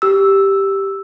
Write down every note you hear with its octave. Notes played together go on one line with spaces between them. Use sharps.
G4 E6